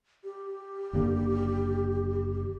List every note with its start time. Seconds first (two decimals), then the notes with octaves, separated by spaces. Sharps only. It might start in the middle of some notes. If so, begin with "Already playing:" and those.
0.24 G4
0.93 F#1 D3 A#3